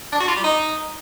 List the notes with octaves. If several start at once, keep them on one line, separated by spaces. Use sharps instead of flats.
D4
F#4
F4
G3
D#4